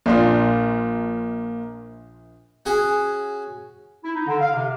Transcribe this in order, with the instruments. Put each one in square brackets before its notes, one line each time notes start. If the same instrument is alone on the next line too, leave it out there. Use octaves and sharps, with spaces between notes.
[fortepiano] A#1 D4 F4 [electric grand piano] A#3
[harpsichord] C#4 F#4 G#4
[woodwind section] E4
D#4
D3
F5
C3